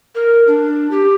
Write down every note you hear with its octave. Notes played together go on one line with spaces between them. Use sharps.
A#4
D4
G4